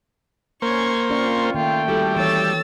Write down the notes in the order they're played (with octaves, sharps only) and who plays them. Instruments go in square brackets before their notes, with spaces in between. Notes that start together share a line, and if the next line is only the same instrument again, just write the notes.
[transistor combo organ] A#3 C5 [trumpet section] C#4 [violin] C#6 G#6
[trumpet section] C4 F4 [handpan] C#4 A#4 D5 [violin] C#6
[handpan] D#3 A#3 [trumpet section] A3 G5 [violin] F4
[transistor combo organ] G3 [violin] E4 [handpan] F#4 A4
[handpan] E3 C#5 [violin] E6 A6